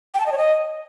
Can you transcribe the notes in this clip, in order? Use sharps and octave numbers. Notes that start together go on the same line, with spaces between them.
G5
A5
D#5
C#5
D#5